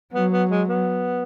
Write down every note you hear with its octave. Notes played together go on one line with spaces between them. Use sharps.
F#3 B3
B3
G#3
B3